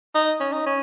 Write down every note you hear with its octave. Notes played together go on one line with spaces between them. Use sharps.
D#4
C#4
D#4
C#4